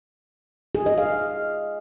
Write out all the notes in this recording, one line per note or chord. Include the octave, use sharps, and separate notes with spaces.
G#4
D#5
F5